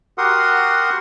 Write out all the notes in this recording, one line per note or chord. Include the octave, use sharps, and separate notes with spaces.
F#4 G4 A#4 F#5 C6 D#6